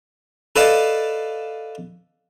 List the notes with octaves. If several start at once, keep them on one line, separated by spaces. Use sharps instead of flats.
A4 B4 D5 D#5 F5 A5